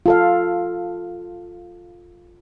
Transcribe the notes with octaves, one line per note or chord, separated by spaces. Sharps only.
F4 A4 F5